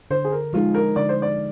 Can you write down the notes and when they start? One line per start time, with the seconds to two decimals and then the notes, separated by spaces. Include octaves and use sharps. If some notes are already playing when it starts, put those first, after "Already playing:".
0.11 D3 C5
0.25 G#4
0.32 A#4
0.53 F3 G#3 D#4 F4 G#4
0.75 A#4
0.96 D3 D5
1.09 C5
1.22 D5